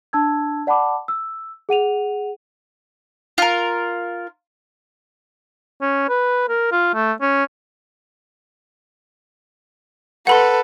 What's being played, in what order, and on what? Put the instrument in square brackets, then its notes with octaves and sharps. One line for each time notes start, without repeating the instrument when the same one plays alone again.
[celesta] D4 A5 E6 G#6
D5 F#5 A5 B5 D6
E6
G#4 F#5 D#7 F7
[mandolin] F4 A#4
[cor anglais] C#4
B4
A#4
F4
A3
C#4
[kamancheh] A4 B4 [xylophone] F#5 B5 C6